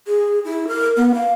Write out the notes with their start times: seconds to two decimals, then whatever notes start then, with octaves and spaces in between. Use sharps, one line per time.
0.07 G#4
0.45 E4
0.67 A#4
0.96 B3
1.14 F5